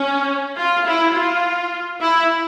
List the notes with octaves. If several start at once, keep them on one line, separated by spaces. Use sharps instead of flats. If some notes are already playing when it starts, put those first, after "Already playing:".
Already playing: C#4
F4
E4
F4
E4